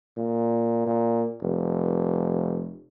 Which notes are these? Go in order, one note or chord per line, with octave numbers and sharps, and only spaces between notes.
A#2
A#2
F1